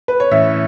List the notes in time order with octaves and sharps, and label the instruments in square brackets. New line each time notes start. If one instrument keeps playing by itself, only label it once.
[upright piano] B4
C#5
[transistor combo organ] A2 E3 C#4 [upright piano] E5